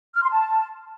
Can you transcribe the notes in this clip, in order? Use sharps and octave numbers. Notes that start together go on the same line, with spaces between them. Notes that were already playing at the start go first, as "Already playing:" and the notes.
F6
C6
A5